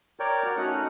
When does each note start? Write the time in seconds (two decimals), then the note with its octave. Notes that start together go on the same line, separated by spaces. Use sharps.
0.20 A#4 C#5 D5 G5
0.45 F#4 F6
0.57 A3 C#4 D#4 F#4 F#5